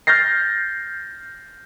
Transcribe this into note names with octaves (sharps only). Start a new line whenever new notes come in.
F6 G6 A6 A#6 C7